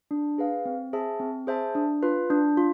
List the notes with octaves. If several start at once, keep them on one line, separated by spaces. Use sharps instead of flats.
D4
G#4 B4 F5
C4
G#4 C5 E5 A5
C4
G#4 C5 E5 A5
D4
F4 B4
D4
F4